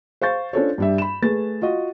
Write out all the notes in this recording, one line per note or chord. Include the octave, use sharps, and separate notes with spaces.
C5 F5 C#6 G6 A6
C#4 D4 F4 A4 C5 C#5
G2 G3 E5
B5 E7
A3 G#4 B4 A6
F4 F#4 D#5